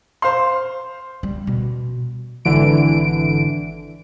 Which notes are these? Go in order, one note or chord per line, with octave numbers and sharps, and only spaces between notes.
C5 F5 C6
G3
B2
G#1 D3 E3 D7